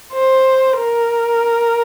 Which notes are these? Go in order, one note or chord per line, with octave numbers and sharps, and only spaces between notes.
C5
A#4